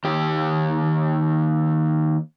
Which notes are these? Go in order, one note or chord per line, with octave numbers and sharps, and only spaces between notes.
D#2 G4